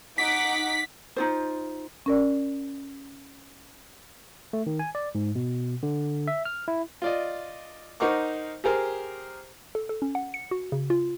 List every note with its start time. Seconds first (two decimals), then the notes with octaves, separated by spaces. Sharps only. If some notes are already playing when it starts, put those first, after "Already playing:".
0.18 D#4 F#5 D6 B6
1.16 D#4 F4 C5
2.06 C#4 A#4 D5
4.53 A3
4.67 D#3
4.79 G#5
4.95 D5
5.15 G#2
5.35 B2
5.83 D3
6.28 E5
6.45 F6
6.68 E4
7.02 F4 D5 D#5
8.00 D#4 A#4 C5 F#5 C#6 D6
8.64 G4 G#4 A#4 C5
9.75 A4
9.89 A4
10.02 C#4
10.15 F#5
10.34 C#7
10.51 F#4
10.72 C#3
10.90 F4